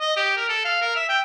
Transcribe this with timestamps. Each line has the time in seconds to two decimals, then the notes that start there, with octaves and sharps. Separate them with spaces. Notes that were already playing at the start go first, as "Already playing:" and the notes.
0.01 D#5
0.17 G4
0.37 A#4
0.49 A4
0.65 F5
0.82 A#4
0.96 E5
1.09 G5